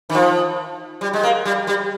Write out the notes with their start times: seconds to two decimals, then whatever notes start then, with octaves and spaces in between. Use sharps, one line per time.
0.10 D#3
0.15 F3
1.01 G3
1.13 G#3
1.23 A#3
1.45 G3
1.67 G3